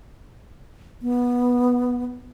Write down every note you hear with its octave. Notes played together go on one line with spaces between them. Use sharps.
B3